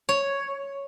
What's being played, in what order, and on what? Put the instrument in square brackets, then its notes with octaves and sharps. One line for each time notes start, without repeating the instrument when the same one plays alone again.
[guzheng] C#5